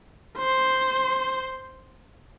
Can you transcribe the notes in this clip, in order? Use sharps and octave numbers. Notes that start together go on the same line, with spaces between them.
C5